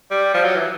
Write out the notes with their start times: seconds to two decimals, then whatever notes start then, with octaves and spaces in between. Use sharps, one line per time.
0.10 G3
0.34 F3
0.44 F#3
0.56 E3